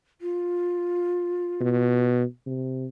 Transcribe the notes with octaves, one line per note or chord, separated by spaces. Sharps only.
F4
B2
C3